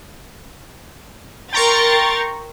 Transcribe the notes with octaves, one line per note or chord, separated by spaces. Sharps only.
A#4 G5 A#5 C6 C#6 A6